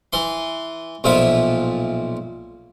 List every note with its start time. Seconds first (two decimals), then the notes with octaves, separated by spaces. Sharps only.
0.13 E3 C6
1.04 B1 A#2 F3 E5